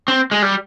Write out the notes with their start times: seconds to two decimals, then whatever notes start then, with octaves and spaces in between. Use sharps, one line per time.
0.08 C4
0.31 G#3
0.42 G3